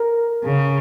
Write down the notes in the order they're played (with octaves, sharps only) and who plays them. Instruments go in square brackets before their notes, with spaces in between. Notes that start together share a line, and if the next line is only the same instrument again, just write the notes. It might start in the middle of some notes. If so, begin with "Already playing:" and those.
Already playing: [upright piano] A#4
[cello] C#3